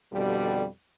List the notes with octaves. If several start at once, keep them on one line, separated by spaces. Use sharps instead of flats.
F2 B2 D3 G3